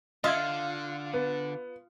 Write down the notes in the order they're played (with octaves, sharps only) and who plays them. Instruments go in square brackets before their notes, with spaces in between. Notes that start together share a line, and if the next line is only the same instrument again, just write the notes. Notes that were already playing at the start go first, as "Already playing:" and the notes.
[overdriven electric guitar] D3 [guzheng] F4 [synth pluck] D#5 E5 G#6
[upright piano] B3